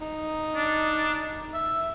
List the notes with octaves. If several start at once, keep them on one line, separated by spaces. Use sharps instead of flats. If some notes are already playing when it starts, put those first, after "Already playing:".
D#4
D4
E5